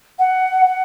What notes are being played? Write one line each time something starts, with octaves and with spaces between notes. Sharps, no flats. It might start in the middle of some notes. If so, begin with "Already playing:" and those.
F#5
F#5